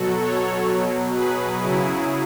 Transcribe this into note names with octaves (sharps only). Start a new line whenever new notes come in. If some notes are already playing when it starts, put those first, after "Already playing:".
Already playing: B2 F#3 F#4 A4
A4 C#5
B2 F#3
G#4 B4
C#3 F#3 E4 G#4